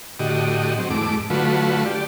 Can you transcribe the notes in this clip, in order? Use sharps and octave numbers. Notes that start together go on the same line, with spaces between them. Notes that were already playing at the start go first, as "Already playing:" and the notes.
A2 D3 F#4 G4 D#5
F#3 C4
E2 G#2 A3 D6
D3 F#3 A3 F4 F#4 B4
G4 D5